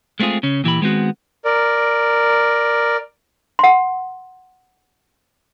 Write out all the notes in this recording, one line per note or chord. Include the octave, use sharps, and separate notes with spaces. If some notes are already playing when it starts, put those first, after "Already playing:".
G#3 A3 C4 F4 G#4
C#3 C#4
A#2 E3 G4 B5
D#3 G#3 B3 C4 F#4
A#4 D5
F#5 C6